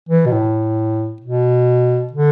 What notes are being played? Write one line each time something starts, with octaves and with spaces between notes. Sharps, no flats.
E3
B2
A2
B2
D3